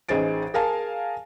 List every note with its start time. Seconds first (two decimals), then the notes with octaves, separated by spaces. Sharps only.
0.09 A1 D#4 G#4 C5 A6 D7
0.54 G#4 A#4 F5 G#5 A5